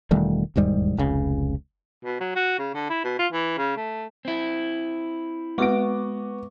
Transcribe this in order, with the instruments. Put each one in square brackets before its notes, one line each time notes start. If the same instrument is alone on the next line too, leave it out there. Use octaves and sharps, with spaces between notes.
[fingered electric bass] E1 D#3 G3 A3
E1 D#2 G#2 G3
F1 C#2 C#3
[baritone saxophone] B2
F#3
F#4
C#3
D3
E4
B2
F4
E3
C#3
A3
[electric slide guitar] C4 E4
[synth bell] G#3 C#6 D6 [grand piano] B3 F#4 D7